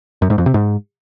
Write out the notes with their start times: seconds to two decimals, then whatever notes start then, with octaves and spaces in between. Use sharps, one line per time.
0.22 F#2
0.30 G#2
0.38 F2
0.46 C3
0.54 G#2